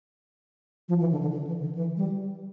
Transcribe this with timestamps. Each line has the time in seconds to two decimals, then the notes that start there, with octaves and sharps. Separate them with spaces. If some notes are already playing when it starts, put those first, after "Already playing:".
0.89 F3
1.00 E3
1.11 D3
1.21 D3
1.32 D3
1.47 E3
1.61 D3
1.75 E3
1.97 G3